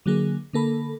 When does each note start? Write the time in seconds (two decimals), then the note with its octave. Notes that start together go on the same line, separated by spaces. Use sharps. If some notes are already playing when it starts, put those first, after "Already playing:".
0.06 D3 F#3 A#3 G#4
0.53 D3 A#3 A4 B5